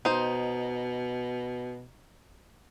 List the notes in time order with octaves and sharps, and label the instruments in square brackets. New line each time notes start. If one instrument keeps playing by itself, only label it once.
[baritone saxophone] B2 [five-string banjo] D#4 C5